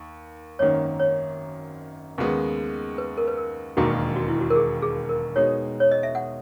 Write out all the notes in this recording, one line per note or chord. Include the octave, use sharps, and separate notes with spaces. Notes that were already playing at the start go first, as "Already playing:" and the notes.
Already playing: D#2
G#1 F#2 D#3 A#3 C#5
C#5
D#2 C#3 G#3 B3
B4
A#4
B4
A#4
E1 D#2 D#3 A#3 F#4
F#4
E4
F#4
A#4
G#4
G#4
A#4
B2 G#3 D#4 G#4 C#5
C#5
D#5
E5
F#5